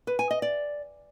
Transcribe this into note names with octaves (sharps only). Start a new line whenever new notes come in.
B4
G#5
D#5
D5